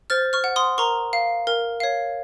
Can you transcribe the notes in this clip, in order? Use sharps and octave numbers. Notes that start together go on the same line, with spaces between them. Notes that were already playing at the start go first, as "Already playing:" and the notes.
C5 F6 A6
C#6 F6
F#5
C6 D#6
A#4 A#5 C#6
F5
A#4
C#5 F5